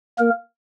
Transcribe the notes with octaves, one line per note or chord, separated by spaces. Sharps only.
A#3 A#4